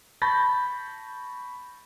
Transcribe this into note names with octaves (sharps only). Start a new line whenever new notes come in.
A5 B5 C#6 G6 A6 A#6